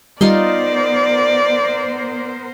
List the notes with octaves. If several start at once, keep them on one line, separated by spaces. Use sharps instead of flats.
G3 B3 D#4 F4 A#4 C5 D5 C6